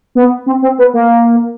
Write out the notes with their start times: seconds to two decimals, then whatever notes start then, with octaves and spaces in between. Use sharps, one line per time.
0.15 B3
0.46 C4
0.62 C4
0.78 B3
0.93 A#3